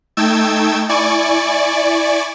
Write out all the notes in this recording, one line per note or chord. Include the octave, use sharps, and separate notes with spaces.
A3 D#4 G5 A5 E6 G#6
E4 D5 G#5 C#6